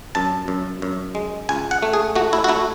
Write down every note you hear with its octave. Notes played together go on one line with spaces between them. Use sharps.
F#2 A5
F#2
F#2
G#3
C#2 G#5
F#5
A3
G#4
A3 F#4
E4
F#4
A3 E4